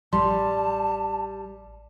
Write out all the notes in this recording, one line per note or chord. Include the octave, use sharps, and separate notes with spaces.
A1 G3 A5 C6